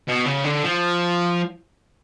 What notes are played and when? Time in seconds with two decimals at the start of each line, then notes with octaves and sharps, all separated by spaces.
0.08 B2
0.26 C#3
0.45 D3
0.63 F3